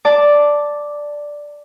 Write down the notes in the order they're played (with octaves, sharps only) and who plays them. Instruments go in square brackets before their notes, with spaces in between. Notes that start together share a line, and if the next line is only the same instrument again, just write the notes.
[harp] D5 A5 D6